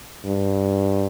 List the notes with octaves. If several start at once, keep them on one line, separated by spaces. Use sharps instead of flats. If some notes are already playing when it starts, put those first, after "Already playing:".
G2